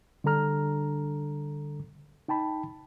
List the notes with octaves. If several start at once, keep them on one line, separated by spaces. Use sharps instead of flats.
D3 G3 D4 A4 A#5 F6
D#4 G5 A5 B5